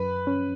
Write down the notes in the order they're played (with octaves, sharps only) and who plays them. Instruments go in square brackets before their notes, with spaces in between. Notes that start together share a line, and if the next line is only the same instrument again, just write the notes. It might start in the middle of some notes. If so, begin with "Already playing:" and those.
Already playing: [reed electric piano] F#2 [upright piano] B4 B5
[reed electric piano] C#4